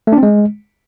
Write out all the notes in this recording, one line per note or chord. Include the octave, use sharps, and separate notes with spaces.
A3
D4
C4
G#3